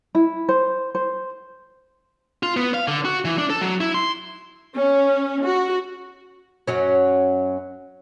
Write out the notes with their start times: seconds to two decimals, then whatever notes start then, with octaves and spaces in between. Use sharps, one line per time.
0.15 E4
0.49 C5
0.95 C5
2.43 F4
2.57 B3
2.74 F5
2.88 D3
3.05 F#4
3.25 E3
3.38 D4
3.50 A4
3.61 F#3
3.81 E4
3.94 C6
4.75 C#4
5.46 F#4
6.67 F#2 F#3 C#4